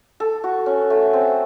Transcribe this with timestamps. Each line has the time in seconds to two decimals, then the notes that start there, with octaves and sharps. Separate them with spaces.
0.20 A4
0.44 F#4
0.66 C#4
0.90 A3
1.13 C4